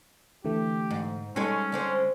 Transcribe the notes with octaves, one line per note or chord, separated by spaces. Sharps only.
D3 E3 A3 G4
G#2
G3 G#3 C#4 D#4 A4 C#5
D3 G#3 C4